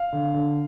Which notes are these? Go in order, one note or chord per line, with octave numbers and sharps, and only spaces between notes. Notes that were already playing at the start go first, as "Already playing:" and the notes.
Already playing: F5
D3
D3